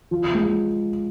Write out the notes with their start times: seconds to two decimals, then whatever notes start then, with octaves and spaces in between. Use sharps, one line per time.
0.11 F3
0.35 G#3